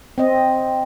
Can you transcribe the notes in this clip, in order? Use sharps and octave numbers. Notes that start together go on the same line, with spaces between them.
C4 D#5